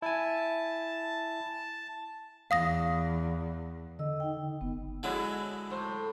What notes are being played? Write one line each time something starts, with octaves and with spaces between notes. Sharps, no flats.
E4 G#5 A5
E2 F5 D#6 A#6
D3 D#5 E6
D#4 G5
F#1 B3
D3 F#3 G#3 E4
A2 C5